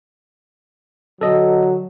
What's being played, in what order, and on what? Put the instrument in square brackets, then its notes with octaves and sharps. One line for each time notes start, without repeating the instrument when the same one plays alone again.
[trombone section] D3 F#3 [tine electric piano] A4 D#5